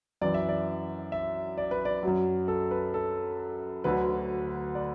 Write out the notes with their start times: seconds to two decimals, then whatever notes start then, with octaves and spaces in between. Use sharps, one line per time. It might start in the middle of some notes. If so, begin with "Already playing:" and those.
0.21 F#2 E3 D5
0.34 E5
0.49 D5
1.12 E5
1.58 D5
1.71 B4
1.85 D5
2.03 F#2 F#3
2.48 A4
2.71 B4
2.94 A4
3.84 D2 D3 F#3 B4
4.75 D5